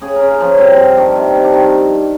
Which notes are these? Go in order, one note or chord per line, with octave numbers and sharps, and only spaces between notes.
C#3 G#4
C#3 A#4
F4
F3 C#4
G2 C4
G2
D#3 D4
C3
C3
D4
D#3